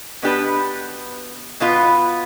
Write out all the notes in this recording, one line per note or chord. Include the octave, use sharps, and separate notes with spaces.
B2 B3 D4 G4 B4
B2 B3 F4 B4